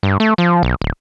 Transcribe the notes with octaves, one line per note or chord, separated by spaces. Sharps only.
G2
A3
F3
B1
D1